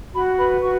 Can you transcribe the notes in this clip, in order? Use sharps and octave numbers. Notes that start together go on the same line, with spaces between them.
F#4 B5
B4 B5
F#4 C#6